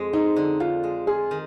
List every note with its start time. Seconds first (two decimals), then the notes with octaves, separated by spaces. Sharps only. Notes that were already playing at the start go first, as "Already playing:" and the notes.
Already playing: F2 G#3
0.13 C4 D#4
0.36 D3
0.60 F2 F4
0.83 G#3
1.07 F4 G#4
1.31 D#3